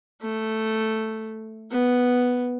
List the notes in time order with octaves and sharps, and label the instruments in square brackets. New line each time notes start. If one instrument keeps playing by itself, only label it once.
[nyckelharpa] A3
B3